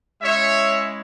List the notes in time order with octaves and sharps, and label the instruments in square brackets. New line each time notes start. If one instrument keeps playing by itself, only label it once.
[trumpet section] G#3 C#4 E4 C#5 E5